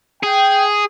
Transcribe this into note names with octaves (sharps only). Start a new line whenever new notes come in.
G#4 G5